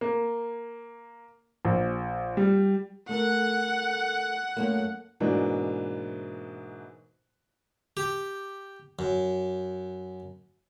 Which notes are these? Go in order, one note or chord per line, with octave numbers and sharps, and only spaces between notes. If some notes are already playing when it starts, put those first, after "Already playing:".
A#3
A#1
G3
A3 A4 A#4 F#5
F#2 A3 A#3
G#2 B2 E3 A#3 D4
G4
F#2